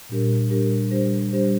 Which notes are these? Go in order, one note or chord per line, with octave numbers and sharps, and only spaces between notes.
A#2 G3 D4 G4 A#4
A#2 G3 D4 G4 A#4
G3 D4 G4 C5
G3 D4 G4 C5